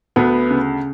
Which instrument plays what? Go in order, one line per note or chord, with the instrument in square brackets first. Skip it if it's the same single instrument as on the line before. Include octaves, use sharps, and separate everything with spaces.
[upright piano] D2 B3 B4
C#3